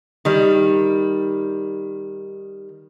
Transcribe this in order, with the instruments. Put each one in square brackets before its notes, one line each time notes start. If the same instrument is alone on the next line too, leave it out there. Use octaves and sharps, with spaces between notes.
[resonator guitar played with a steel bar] D#3 G3